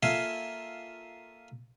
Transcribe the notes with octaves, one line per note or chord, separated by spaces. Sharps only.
A#3 F4 A4 E5 F5 G#5